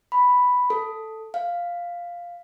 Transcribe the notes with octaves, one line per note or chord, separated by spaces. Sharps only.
B5
A4
F5